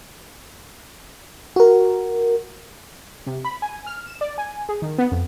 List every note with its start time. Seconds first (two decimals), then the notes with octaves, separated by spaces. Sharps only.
1.56 F#4 A#4
3.26 C3
3.45 B5
3.62 G#5
3.86 F6
4.06 E7
4.21 D5
4.38 G#5
4.69 G#4
4.82 D#3
4.98 B3
5.11 F2